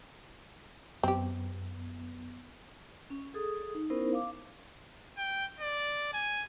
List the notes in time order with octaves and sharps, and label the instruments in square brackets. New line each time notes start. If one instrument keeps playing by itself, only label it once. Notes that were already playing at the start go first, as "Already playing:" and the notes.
[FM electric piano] F#2 B3 [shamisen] C4 G4
[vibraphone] C#4
G#4 A4 D#6
D#4
B3 C#4 D#4 E4 A#4 C5
F5 D6
[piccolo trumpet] G5
D5
G#5